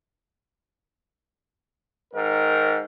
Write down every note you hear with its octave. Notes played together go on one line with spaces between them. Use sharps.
G#2 D#3 A#4